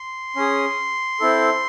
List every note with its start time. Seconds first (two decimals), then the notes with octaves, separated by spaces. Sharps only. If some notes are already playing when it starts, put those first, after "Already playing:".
Already playing: C6
0.36 C#4 G#4
1.20 C4 E4 A4